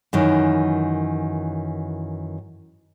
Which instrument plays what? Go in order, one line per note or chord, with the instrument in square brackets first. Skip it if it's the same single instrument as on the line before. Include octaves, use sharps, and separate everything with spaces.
[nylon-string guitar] F#2 D#3 E3